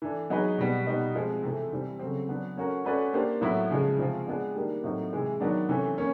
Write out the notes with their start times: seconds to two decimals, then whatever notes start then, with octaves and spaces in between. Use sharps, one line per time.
0.02 E3 A3 D4
0.30 F#3 B3 D#4 G#4 B4
0.58 B2 G3 B3
0.87 B2 G3 B3 D#4
1.15 F3 G#3 C4
1.42 C3 E3 A3
1.72 C3 E3 G3 C4
1.99 C#3 F#3 A3 C4
2.28 F#3 B3 D4
2.56 A3 C#4 F#4 A#4
2.85 A3 C#4 F#4 B4 D5
3.13 A#3 D4 G4 C5
3.41 A2 F#3 B3 E4
3.70 C#3 F3 G#3
3.99 C3 F3 G#3 C4 F4
4.27 G#3 B3 D4
4.55 D#3 G3 A#3 D4 G4
4.84 A2 F#3 A3 C4 D#4
5.13 C3 E3 G#3
5.40 D#3 F#3 B3 D4
5.69 C3 E3 A3 C#4
5.98 A#3 C#4